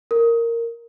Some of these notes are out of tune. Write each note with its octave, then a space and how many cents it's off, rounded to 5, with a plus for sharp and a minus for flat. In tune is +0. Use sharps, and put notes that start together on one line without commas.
A#4 -10